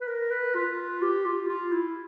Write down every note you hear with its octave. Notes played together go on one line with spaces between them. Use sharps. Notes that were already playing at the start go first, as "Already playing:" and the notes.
B4
A#4
B4
F4
G4
F4
F4
E4